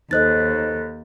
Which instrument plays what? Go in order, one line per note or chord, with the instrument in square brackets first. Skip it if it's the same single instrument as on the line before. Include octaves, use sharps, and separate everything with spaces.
[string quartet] D#2 [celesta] D#4 C5 D#5 [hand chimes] A4 F#6 A6